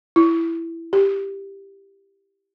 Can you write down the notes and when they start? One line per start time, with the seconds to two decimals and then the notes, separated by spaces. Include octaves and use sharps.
0.16 E4
0.93 G4